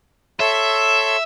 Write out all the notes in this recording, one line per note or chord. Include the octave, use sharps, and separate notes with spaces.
A4 C#5 E5 C6